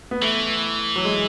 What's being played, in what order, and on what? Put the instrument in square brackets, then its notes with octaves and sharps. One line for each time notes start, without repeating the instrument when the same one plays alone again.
[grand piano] B3
[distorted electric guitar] E3 [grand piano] A3
[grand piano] F#3
G#3